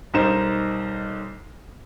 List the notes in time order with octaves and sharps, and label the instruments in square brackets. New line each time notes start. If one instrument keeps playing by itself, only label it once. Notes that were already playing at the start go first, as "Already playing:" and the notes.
[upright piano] B1 G3 D#4 A#4 C5 E7